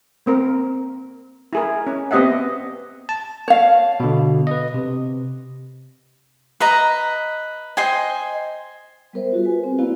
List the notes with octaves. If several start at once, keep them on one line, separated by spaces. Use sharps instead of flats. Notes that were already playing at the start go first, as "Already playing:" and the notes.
A#3 C4 A#4
E4 G#4 A#4
C#4
B3 C4 G4 D#5 E5 F#5
A5
C#5 F5
B2 D3
B4 D#5
C3
B4 D#5 A#5
C5 D#5 G5 G#5
G3 B3 A#4 C5 E5
F4 F#4 G#4
B4 G#5
C4
A#3 B3 E4 F#4 D5 F5